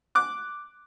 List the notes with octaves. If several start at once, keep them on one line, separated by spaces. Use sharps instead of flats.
D6 F#6